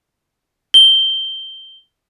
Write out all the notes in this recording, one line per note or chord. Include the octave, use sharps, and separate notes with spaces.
G7